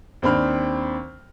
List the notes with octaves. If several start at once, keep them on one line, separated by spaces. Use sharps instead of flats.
D#2 C4 D4 B5 F6